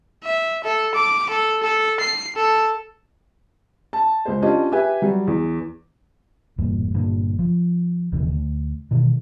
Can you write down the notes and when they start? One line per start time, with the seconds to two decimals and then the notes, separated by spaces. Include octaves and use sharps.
0.23 E5
0.64 A4
0.95 D6
1.30 A4
1.63 A4
2.00 C7
2.36 A4
3.93 A5
4.26 C#2 C5
4.42 C#4 D4 F4 G4 D#5
4.72 G4 B4 E5 G#5
5.02 F#3 G3
5.27 E2
6.58 E1 E2 G2 A#2
6.94 G1 A#2 D3
7.39 F3
8.12 E1 D#2 C#3 E3
8.28 D2
8.91 B2 D#3 E3